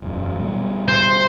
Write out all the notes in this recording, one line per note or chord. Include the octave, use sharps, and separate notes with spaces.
E1 F#2
B2 G3
C5